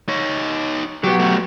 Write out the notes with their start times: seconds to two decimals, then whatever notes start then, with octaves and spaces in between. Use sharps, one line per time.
0.09 D#4 C#5
1.04 F#3 B3 G4
1.19 A3 G4